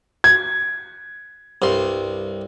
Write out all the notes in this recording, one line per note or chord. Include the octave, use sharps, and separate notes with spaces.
G#6
C2 G2 C6